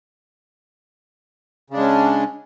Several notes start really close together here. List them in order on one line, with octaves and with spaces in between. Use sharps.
C#3 D4 G#3 C#4